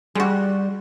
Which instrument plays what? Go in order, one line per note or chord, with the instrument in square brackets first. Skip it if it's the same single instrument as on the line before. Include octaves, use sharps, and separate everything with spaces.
[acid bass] G3 [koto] G#3 F#4